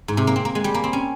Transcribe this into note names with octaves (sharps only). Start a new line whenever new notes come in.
G#2
C3
A#3
C4
A#3
G#3
G3
A#3
C4
C#4